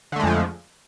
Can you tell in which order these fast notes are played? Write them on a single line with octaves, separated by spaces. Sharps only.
D3 A3 G#3 F2 F3